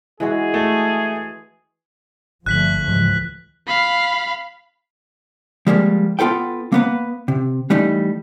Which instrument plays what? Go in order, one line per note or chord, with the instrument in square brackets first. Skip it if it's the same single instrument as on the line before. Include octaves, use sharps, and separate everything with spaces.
[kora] E3 G#3 F#4 [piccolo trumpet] G#4
[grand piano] A3
[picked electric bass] G1 [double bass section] D3 F3 A3 [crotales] F#6 B6 F#7
[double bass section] C#2 E3 [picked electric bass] G#2 F3 G#3
[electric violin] F5 B5
[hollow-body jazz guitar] F3 G3 G#3 A#3
B3 F4 A4 B4 G5
A#3 B3 B4
C3
E3 G3 A3 D#4